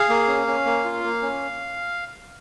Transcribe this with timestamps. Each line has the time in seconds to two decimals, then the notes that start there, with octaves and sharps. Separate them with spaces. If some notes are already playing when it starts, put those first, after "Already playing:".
Already playing: G#4 F5
0.09 A#3
0.28 C#4
0.47 C#4
0.65 A#3
0.85 F4
1.04 A#3
1.22 C#4